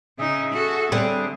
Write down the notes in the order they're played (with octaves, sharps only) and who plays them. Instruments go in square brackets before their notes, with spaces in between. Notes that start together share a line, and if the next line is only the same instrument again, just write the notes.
[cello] C#3 D#4 [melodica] G#4 E5
[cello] F#4 A4
[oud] D3 G3 [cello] C4